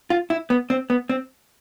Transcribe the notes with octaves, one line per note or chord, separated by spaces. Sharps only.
F4
E4
B3
C4
B3
C4